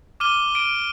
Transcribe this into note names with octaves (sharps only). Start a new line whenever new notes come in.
D6 F6 D#7 G7
D7 D#7